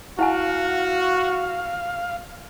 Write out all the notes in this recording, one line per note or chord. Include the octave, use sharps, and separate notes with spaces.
E4 F#4 F5 F#5 G#5